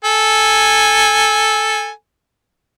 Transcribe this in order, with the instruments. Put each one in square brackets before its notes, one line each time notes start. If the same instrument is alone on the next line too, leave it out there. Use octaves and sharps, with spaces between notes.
[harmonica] A4 G#5